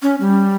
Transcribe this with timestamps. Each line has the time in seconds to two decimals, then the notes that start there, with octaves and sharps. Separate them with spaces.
0.02 C#4
0.20 G3